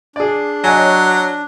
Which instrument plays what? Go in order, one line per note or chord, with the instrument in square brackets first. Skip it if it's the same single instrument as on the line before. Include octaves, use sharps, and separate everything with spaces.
[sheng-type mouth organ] D4 [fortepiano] G#4 D5
[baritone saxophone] F#3 [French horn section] C#5 [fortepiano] D#5 G#5